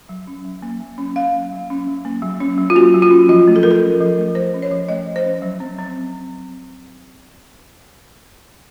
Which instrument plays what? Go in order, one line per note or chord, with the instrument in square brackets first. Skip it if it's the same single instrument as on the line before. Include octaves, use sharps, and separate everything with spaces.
[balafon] F#3
C#4
F#3
A#3
F#3
C#4
F#3 F5
A#3
F#3
C#4
F#3
A#3
F#3
C#4
F#3
F4
A#3 F#4
F#3
F4
C#4
F3 F4
A3
A4
F3 A#4
A4
C#4
F3
A3
F3 C5
C#4
C#5
F3
A3 D#5
F3
C5
C#4
F#3
C4
C4